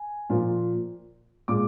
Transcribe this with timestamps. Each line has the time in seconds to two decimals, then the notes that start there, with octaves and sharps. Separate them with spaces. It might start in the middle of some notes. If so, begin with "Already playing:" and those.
Already playing: G#5
0.30 A#2 F3 A#3
1.48 A#2 G#3 D6